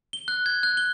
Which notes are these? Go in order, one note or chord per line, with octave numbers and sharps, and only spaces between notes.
G7
F#6
G#6
F#6
G7